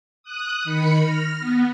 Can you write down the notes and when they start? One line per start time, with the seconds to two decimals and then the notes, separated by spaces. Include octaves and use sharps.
0.23 D#6 F#6
0.64 D#3 B5 C#7
1.01 F6 A#6
1.41 B3